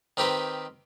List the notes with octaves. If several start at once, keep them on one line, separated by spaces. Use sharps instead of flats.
D#3 C4 G4 A#4 B4